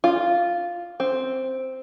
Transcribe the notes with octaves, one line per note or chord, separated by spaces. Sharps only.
F4
C4